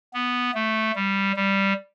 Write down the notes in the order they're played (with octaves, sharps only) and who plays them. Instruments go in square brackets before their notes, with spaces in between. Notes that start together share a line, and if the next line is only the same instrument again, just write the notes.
[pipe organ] B3
A3
G3
G3